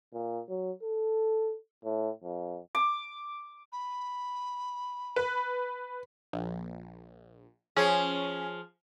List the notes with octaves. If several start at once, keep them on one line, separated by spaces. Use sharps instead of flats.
A#2
F#3
A4
A2
F2
D6
B5
B4
A#1
F3 C#4 G#4